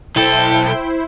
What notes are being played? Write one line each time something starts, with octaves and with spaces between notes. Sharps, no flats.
B1 E4 A4 C5 G5